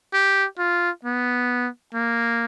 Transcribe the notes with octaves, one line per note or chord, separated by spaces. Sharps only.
G4
F4
B3
A#3